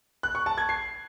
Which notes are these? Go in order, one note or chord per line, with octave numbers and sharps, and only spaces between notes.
F#6
C#6
A5
G#6
C7